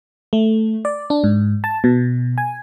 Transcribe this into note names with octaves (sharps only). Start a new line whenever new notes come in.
A3
D5
D4
G#2
A5
B2
G#5